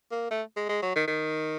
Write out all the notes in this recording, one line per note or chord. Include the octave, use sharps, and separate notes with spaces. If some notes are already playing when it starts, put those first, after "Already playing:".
A#3
A3
G#3
G#3
F#3
D#3
D#3